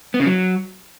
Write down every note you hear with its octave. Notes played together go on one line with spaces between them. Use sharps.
B3
C#3
F#3